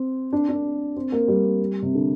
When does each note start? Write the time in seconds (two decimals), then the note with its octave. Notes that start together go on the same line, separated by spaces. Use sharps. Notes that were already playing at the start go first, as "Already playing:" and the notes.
Already playing: C4
0.33 D4
0.48 D4
0.96 C4
1.12 A#3
1.28 G3
1.82 C3
1.95 D3